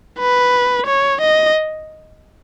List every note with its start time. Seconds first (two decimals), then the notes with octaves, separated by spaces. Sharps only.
0.19 B4
0.86 C#5
1.21 D#5